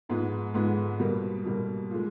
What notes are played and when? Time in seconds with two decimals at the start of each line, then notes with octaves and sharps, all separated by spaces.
0.09 G#2 F3 G#3 B3
0.54 G#2 F3 G#3 B3
0.99 B2 G3 A#3
1.45 B2 G3 A#3
1.91 A#2 F3 G#3